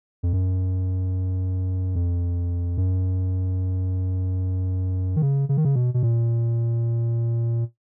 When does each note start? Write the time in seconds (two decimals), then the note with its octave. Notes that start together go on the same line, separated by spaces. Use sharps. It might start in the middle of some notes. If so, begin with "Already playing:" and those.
0.23 F2
0.33 F#2
1.95 F2
2.77 F#2
5.16 D#3
5.22 C#3
5.49 C#3
5.57 D#3
5.65 C#3
5.76 B2
5.94 B2
6.03 A#2